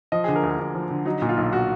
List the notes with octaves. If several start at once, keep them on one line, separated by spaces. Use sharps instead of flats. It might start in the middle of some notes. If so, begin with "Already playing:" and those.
F3 D#5
D3 G#4
A#4
D2 G#4
D2
F3
D3
F#3 D#4
A#2
F4
B1
F#4